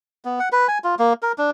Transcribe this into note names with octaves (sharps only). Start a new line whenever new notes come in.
B3
F#5
B4
G#5
F4
A#3
A#4
D4